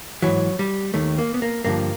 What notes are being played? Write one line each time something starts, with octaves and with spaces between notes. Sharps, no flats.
G#2 E3 F#3
G3
D#2 D#3 A3
A#3
B3
A#3
G2 D3 F3 A#3